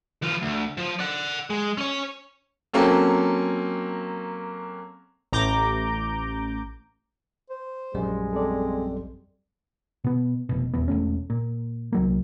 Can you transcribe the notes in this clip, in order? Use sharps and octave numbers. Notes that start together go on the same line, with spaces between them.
E3 F4
D2
F3
D5 F#5
G#3
C#4 C#5
F#3 A#3 C4 C#4 A4
A1 A#5 D6 G6
C5
A#1 F#2 G3 G#3
C4 A4 D5
B2 B3
F1 B2
D#1 E2 B3
E1 A3 C#4
A#2
C2 F#3 A#3